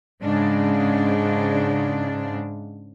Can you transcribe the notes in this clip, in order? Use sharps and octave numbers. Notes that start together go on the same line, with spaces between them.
G#2 C#3 D4